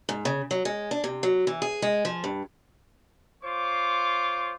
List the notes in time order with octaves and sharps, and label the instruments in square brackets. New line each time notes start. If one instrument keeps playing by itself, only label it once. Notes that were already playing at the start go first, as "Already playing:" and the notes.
[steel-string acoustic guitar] G#2
C#3
F#3
G#3
D4
C3
F#3
E3
G#4
G#3
F3
G2
[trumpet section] F4 C5 C#5 D6